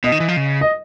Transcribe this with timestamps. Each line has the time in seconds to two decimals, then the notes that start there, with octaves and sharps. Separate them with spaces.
0.04 B2 D#5
0.12 D#3
0.20 E3
0.28 F3
0.37 C#3
0.61 D#5